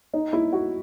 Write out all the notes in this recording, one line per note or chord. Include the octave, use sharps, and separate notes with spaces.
D#4
E4
F#4